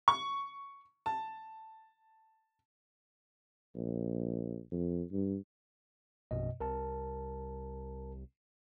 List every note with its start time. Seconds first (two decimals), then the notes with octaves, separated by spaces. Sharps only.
0.08 C#6
1.06 A5
3.76 A#1
4.71 F2
5.12 G2
6.31 A#1 F#2 B2 D#5
6.60 C2 A#4 A5